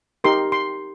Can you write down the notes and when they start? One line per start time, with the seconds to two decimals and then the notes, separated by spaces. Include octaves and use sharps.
0.24 D#4 G4 A#4 C6
0.52 C6